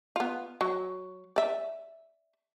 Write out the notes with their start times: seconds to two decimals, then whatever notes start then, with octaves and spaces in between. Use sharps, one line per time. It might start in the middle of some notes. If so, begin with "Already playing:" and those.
0.16 B3 F4
0.61 F#3
1.36 D5 E5